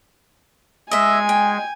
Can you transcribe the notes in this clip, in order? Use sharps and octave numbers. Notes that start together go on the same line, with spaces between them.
G#3 D#5 E5 G#5
G5